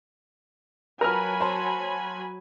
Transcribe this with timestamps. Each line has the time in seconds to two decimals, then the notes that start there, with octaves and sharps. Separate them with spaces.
1.01 F#3 F4 A#4 B4 G#5 A5 B5 F6
1.40 C5 C#5 A5